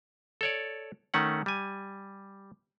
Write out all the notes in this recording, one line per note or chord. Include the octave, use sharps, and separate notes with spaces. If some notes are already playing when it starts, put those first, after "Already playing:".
A4 C#5 D5
D#3 A3 C#4 F#5
G3 G#5